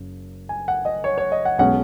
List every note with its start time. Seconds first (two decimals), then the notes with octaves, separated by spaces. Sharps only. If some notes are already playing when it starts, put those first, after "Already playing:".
Already playing: F#1 F#2 C#3
0.49 G#5
0.68 F#5
0.85 D#5
1.04 C#5
1.18 C#5
1.32 D#5
1.45 F#5
1.58 B1 B2 G#3 C#4 F#5